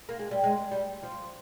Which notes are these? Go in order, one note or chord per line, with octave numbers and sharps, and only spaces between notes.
A#3
G#3
G3
G#3
G3
F3